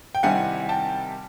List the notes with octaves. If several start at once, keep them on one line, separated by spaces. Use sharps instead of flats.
G5
C3 D#3 G3 C4 E4 F#5 G#5
G5 A5